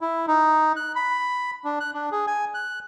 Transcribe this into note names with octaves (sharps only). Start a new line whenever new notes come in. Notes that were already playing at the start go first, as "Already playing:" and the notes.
E4
D#4
F#6
B5
D4
F#6
D4
G#4
G#5
F#6